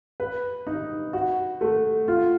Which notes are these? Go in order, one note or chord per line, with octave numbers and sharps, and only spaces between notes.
B4
D#4
F#4
A3
F4